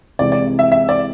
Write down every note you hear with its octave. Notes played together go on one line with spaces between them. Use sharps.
C2 C3 E3 G#3 D5
D5
E5
E5
D5